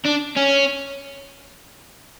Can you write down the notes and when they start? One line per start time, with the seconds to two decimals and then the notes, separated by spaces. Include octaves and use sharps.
0.06 D4
0.37 C#4